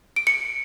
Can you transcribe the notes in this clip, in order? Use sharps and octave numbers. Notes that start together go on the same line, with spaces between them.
D7
C#7